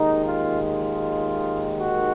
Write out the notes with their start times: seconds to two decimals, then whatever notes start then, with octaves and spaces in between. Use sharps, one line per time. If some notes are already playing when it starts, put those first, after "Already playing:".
Already playing: D#2 D#3 G#3 D#4
0.27 F4
0.65 F4
1.80 F#4